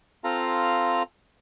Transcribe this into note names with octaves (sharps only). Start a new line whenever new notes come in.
C4 F4 A4 F5 A#5